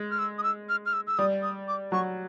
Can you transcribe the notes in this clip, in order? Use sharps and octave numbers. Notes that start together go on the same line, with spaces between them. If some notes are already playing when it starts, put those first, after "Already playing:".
Already playing: G#3
F6
E6
D#6
E6
F6
F6
E6
E6
G3 D#6
D#6
D6
F#3 C#6